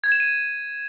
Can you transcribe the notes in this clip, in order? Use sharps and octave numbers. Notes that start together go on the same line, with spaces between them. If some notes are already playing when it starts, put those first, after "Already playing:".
G#6
E7
D#7